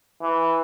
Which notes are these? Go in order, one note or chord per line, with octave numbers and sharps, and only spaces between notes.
E3